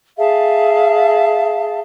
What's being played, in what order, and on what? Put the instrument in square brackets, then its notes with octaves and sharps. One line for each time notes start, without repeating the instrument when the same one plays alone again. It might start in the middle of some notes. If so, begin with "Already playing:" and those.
[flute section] G#4 E5 F5 A5